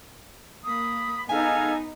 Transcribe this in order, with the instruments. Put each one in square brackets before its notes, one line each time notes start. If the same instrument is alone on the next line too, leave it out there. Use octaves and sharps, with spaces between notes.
[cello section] A#3 [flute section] B5 D#6
[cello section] B3 D#4 [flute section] G#4 A4 F5 [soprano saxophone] G#5